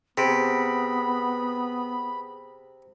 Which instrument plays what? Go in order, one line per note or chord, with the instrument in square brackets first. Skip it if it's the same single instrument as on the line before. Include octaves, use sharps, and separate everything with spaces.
[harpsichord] C3 [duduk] B3 [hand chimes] G#4 B6 D7 [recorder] B5